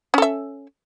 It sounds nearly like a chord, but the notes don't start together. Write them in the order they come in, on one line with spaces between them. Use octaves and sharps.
C#4 A4 E5